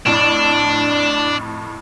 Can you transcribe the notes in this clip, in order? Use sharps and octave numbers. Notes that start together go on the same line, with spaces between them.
F2 A2 D4